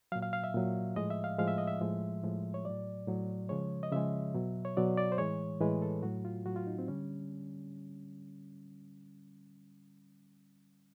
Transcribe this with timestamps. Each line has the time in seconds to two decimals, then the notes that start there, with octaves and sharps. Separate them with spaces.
0.12 F#3 F5
0.15 A#2
0.22 F5
0.33 F5
0.44 E5
0.54 A#2 F#3
0.96 A2 F3 G#3 D#5
1.10 E5
1.24 F5
1.38 A2 F3 G#3 F5
1.48 E5
1.58 D#5
1.68 E5
1.81 A2 F3 G#3
2.23 A2 F3 G#3
2.54 C#5
2.65 A2 F#3 D5
3.07 A2 F#3
3.49 C#3 F3 G#3 C#5
3.83 D#5
3.92 C#3 F3 G#3 E5
4.35 B2 F#3
4.65 C#5
4.77 B2 F#3 D5
4.98 D5
5.12 C5
5.18 A2 E3 G#3 C#5
5.61 A2 E3 G#3 B4
5.82 A4
6.03 A2 F#3 F#4
6.25 F4
6.46 A2 F#3 F#4
6.56 F4
6.67 D#4
6.79 C4
6.88 D3 G3 C#4